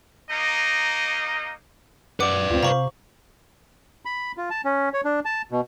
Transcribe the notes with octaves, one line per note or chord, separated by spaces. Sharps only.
A#3 D#4 D#5
F#2 B4 D5 F#5 D6
D2 C4 F4
C3 C5 F5 A#5 C#6 F#7
B5
F4
A5
C#4
C#5
D4
A5
B2